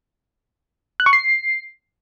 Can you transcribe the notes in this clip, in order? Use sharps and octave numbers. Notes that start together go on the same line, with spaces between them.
F#6
C#6
C7